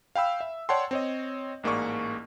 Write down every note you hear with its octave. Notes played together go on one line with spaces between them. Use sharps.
F5 G5 B5 E6
E5
C#5 D5 F#5 G5 A5 C6
C4 C#5 D#5
A1 G#2 A#3 G#4 D5 C#6